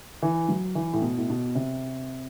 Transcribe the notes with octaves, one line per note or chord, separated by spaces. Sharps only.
E3
F#3
E3
A2
B2
A2
B2
C3